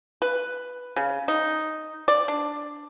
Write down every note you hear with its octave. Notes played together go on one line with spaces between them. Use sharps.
B4
C#3
D#4
D5
D4